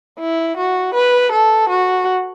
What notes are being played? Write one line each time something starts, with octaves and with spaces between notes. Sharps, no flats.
E4
F#4
B4
A4
F#4